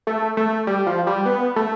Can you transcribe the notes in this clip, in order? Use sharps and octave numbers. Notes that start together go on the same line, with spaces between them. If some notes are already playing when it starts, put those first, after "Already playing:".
A3
A3
G3
F3
G3
B3
A3